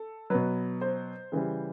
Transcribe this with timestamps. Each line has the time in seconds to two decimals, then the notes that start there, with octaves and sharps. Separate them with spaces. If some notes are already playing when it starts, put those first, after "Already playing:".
Already playing: A4
0.30 B2 F#3 B4
0.81 C5
1.32 C#3 E3 G3